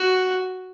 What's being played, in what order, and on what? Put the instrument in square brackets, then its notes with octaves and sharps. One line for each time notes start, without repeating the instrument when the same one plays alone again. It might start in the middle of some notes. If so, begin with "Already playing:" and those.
Already playing: [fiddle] F#4